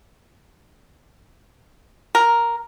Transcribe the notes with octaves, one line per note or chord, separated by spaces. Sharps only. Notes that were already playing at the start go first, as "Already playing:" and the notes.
A#4